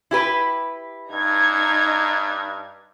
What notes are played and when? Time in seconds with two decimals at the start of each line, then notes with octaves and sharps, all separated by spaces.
0.11 E4 G4 B4
1.12 G2 D#4 A#5 G#6